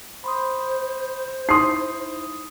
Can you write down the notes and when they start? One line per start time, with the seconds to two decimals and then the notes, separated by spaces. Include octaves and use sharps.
0.24 C5 B5 C6 D#6
1.49 D#4 E4 C6 D#6 C7